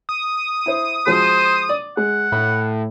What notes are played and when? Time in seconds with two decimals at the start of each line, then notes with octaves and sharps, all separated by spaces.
0.09 D#6
0.66 E4 C5
1.06 F3 G#3 F#4 C5
1.69 D5
1.97 G#3 F#5
2.32 A2 B5